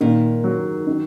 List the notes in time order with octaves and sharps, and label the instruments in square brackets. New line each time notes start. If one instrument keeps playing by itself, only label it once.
[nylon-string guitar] A#2 [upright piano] D#3
[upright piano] F#3
D#3